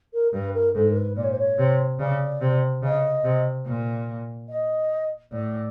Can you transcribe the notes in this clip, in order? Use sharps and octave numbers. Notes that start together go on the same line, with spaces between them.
A#4
G2 B4
A#4
G#2 A4
A#4
B4
A#2 D5
C#5
C5
C#5
C3
C#3 D5
C3
C#3 D#5
C3
A#2
D#5
A2 D5